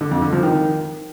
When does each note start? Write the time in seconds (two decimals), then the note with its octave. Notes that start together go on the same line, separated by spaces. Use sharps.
0.01 D3
0.11 F2
0.22 D3
0.32 F3
0.43 D#3